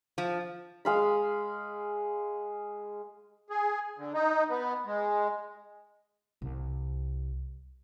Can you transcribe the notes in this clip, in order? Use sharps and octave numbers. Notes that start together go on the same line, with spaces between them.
F3
G#3 F5 B5
G#4
D3
D#4
B3
G#3
C2